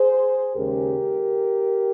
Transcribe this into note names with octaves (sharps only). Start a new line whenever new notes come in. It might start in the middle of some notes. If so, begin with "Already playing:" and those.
Already playing: G#4 C5
D#2 C#3 G#3 C#4 G4 A#4